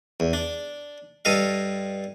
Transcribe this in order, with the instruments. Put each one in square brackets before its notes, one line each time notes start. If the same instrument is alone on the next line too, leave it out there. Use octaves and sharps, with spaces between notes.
[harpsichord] E2
D4
G2 A4 D#5 F5